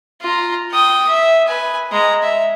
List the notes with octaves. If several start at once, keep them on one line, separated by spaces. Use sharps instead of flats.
F4 A#5
G5 D#6
E5
B4 G#5
G#3 A#5
E5